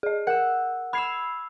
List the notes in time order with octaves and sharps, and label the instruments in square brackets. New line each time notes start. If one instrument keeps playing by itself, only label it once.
[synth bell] G#4 D#5
[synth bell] A#4 [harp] F#5 E6
[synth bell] B5 G#6 C7 [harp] E6 F6